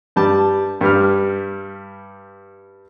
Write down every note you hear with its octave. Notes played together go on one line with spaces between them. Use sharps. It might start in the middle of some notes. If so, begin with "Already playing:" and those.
G2 G3 A5
G2 G3 F6